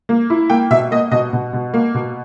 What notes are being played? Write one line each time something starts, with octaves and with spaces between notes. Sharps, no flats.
A#3
E4
A#3 G5
B2 E5
A#3 D#5
B2 D#5
B2
B2
A#3
B2